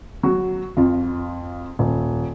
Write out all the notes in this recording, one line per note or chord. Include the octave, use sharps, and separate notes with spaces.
F#3 F#4
F2 F4
D#1